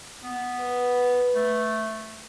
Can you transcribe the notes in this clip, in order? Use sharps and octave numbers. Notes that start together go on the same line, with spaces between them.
B3
B4
A3